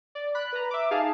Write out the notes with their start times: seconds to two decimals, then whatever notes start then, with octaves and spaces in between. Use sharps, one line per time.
0.15 D5
0.35 B5 F#6
0.52 B4 A#5
0.71 E5 D6
0.91 D#4 G#4 F5 A5